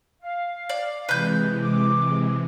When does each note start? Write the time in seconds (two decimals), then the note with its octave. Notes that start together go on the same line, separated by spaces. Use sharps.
0.21 F5
0.69 D5
1.09 C3 E3 G#3 B4 G6
1.61 D6